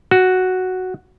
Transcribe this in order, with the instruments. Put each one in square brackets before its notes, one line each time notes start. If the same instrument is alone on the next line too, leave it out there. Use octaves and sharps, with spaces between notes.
[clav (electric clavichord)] F#4